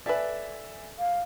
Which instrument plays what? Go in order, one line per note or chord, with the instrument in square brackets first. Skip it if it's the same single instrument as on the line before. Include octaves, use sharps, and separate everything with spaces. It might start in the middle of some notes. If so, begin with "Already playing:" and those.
[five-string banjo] A4 B4 [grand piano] D5 E5 G#5
[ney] F5